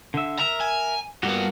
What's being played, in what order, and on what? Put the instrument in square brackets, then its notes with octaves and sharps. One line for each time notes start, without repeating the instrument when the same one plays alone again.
[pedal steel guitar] D3 E5
[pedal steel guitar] A#4 E5 [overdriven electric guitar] A#5
[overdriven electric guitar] G#5
[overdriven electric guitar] G2 B3 [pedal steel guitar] A#3 F#4